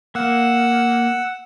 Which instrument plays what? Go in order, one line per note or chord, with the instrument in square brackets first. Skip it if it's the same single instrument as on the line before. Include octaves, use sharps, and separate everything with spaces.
[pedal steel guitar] A#3 [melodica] F#5 E6